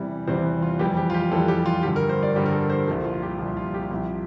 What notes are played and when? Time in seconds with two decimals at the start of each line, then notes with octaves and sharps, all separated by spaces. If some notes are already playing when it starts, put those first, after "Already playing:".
Already playing: E2 C3 E3 G3
0.27 E2 C3 E3 G3 C5
0.62 F4
0.79 F2 E3 G3 G4
0.97 G4
1.10 F4
1.14 G4
1.31 F2 E3 G3 A4
1.48 G4
1.66 F4
1.83 G2 D3 G3 G4
1.96 A#4
2.09 C5
2.23 D5
2.35 G2 D3 G3 G4
2.46 A#4
2.52 A4
2.70 C5
2.87 C2 A#2 F3 A4
3.04 F4
3.22 G4
3.39 C2 A#2 F3
3.57 F4
3.74 G4
3.91 C2 C3 F3